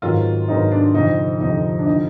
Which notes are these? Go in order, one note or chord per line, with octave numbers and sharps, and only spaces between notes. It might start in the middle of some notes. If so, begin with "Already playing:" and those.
G#1 G#2 D#3 F#3 B3 F4
G#1 G#2 D#3 F#3 B3 D#4
D4
F1 F2 D3 F3 D#4
F1 F2 D3 F3 D#4
D4
D3 F3 D#4